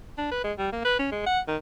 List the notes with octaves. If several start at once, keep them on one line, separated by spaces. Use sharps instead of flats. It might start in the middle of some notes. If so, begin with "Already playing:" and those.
D4
B4
G#3
G3
A#3
B4
C#4
G#3
F#5
D#3